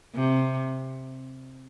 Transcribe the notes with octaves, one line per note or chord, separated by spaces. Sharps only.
C3